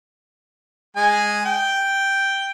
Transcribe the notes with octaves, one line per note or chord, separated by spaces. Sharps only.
G#3 G#5
G5